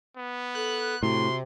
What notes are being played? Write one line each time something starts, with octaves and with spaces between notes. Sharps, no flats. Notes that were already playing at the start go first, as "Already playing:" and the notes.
B3
A4 F#6
A2 C3 F#4 C6